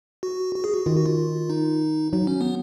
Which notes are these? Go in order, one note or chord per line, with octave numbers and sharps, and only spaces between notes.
F#4
F#4
G#4
F#4
D#3 F4
F#4
F4
D#4
F#3 D#4
C#4
B3